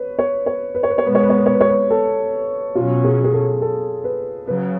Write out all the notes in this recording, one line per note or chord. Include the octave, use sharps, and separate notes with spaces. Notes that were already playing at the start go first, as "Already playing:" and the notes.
Already playing: B4 C#5
C#5
C#5
B4
C#5
B4
C#5
B2 G#3 B3 B4
C#5
B4
C#5
B4
C#5
B4
C#5
B4
A4
B2 F#3 C#4 F4
G#4
G#4
A4
A4
B4
C#3 F#3 B4